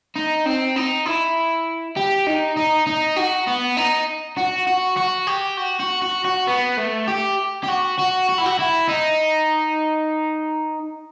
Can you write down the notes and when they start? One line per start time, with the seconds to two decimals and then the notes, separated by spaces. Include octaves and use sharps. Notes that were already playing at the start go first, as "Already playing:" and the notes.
0.16 D#4
0.46 C4
0.76 D#4
1.06 E4
1.97 G4
2.27 D#4
2.57 D#4
2.87 D#4
3.17 F#4
3.47 B3
3.77 D#4
4.37 F#4
4.67 F#4
4.97 F#4
5.27 G4
5.57 F#4
5.80 F#4
6.02 F#4
6.25 F#4
6.48 B3
6.78 A3
7.08 G4
7.63 G4
7.68 F#4
7.98 F#4
8.29 F#4
8.38 E4
8.46 F#4
8.59 E4
8.88 D#4